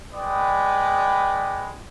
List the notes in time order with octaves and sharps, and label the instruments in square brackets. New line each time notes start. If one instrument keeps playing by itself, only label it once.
[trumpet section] G#3 B4 D5 G5 B5 D#6